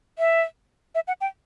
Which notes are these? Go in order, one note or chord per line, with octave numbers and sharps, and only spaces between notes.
E5
E5
F#5
G5